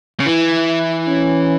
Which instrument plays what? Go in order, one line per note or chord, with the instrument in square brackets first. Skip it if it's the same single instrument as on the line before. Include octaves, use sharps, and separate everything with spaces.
[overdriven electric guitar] C#3
[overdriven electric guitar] E3 [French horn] E4
[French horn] C#4